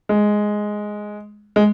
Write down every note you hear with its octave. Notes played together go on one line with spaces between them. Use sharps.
G#3
G#3